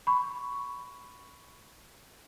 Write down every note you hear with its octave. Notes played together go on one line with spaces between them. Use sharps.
B5 C#6